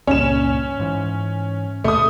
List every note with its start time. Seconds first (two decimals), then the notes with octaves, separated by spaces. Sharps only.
0.07 C#2 G2 A#2 C#4 E7
0.80 G#2 E3
1.84 D#2 B2 A3 D#6